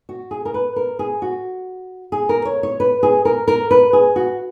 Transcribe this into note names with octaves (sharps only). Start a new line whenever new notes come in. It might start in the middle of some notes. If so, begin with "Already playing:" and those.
F#4
G#4
A#4
B4
A#4
G#4
F#4
G#4
A#4
C#5
C#5
B4
G#4
A#4
A#4
B4
G#4
F#4